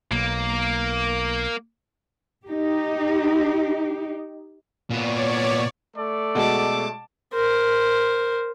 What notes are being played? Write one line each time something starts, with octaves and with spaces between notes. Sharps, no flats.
B1 A#3
D#4 G4
A#2 B3 C#5 D5
A3 A4 D5
B2 G#3 A5 D6
A#4 C5